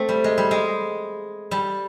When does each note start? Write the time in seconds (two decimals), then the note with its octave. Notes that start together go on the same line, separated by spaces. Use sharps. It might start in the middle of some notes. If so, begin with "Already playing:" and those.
Already playing: A3 C4
0.09 G3
0.24 G#3
0.38 G3
0.51 G#3
1.51 G3